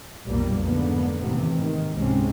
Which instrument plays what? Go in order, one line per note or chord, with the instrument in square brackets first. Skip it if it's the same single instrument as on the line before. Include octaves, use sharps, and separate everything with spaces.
[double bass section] B1 F2 A#2 G3 A#3 B3
F1 G#2 D3 A#3 B3
A1 D#2 C3 E3 A3 B3
G#2 D#3
C#2 G#2 C3 G#3 C4 C#4